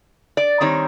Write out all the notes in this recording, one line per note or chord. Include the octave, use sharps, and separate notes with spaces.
D5
D#3 G3 C4 D#4 C#5